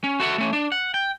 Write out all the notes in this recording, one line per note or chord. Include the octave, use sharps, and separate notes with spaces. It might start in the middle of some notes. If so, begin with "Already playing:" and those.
C#4
F#4 A4 E5 F#5
A3 C#4
D4
F#5
G5